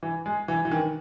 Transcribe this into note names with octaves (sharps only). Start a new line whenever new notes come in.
E3
G#3
E3
E3
D#3